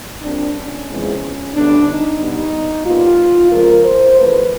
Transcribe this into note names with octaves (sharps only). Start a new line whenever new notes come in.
A#2 G3 C4 D4
C#4
E2 C#3 F3 G#3 C4
D2 D3 G3 B3 D4
D#4
B2 G3 B3
A#2 G3 B3 F4
F2 C#3 F3 G#3 A#4
C5
E2 C3 F3 A3 B4